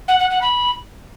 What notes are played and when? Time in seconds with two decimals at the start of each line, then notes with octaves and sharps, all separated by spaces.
0.08 F#5
0.19 F#5
0.30 F#5
0.41 B5